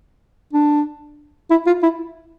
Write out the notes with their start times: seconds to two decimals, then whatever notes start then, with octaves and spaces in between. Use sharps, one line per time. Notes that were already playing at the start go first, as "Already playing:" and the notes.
0.53 D4
1.50 E4
1.67 F4
1.83 E4